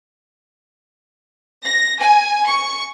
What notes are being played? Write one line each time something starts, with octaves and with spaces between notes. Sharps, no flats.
A#6
G#5
C#6